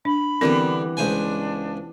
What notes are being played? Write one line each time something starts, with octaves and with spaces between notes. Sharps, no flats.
D4 B5
D3 E3 G3 B3 C4 A#4
C#2 D4 C5 G#5